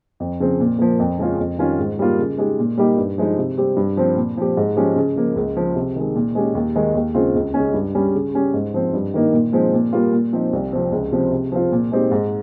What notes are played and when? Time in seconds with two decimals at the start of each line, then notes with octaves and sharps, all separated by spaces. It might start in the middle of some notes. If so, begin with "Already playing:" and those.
0.20 F2
0.40 C#3 F3 C4
0.60 A#2
0.79 F3 A#3
0.99 F2
1.19 C#3 G#3 C#4 F4
1.39 F2
1.58 D#3 G3 C#4 F4
1.79 G#2
1.99 G3 A#3 F4
2.19 C#3
2.38 G#3 D#4 G4
2.59 A#2
2.78 G3 A#3 D#4 G4
2.97 G2
3.18 F3 G#3 D#4
3.38 C3
3.58 G3 C4 G4
3.77 G2
3.97 F3 C4
4.16 A#2
4.37 F3 C4 G4
4.57 G#2
4.77 F3 G#3 C#4 G4
4.96 C#3
5.16 F3 A#3
5.36 C#2
5.57 C#3 F3
5.76 C3
5.96 D#3 G#3
6.15 A#2
6.35 G#3 C#4 G4
6.55 D#2
6.76 D#3 G#3 D#4
6.95 D#2
7.15 C#3 G#3 C4 F4
7.35 C#2
7.54 C#3 G#3 C#4
7.74 G2
7.95 G3 C#4
8.14 C#3
8.34 G3 C#4 G4
8.54 G#2
8.74 F3 C4
8.94 G2
9.14 D#3 A#3 D#4
9.33 A#2
9.53 F3 G#3 C4 D#4
9.73 A#2
9.93 G3 A#3 F4
10.12 A#2
10.33 F3 C4 D#4
10.53 C2
10.73 C3 F3 C4
10.92 C#2
11.12 C3 F3 C4
11.31 C3
11.52 F3 C4 F4
11.72 A#2
11.92 G#3 C4 D#4 G4
12.11 G#2